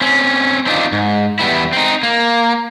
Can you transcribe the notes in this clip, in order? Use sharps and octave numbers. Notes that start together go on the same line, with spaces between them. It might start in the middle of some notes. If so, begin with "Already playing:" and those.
C4 C#4
C4 D4 D#4 F4
G#2
E2 G2 G3 B3 E4
C4 D#4
A#3